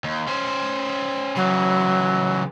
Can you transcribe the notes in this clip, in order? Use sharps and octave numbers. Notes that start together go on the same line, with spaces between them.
D#2
C#4 C5
C#3 E3 F#3